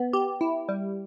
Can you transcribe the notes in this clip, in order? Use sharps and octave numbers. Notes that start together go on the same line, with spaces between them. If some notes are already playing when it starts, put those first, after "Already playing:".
Already playing: B3
G4
E4
G3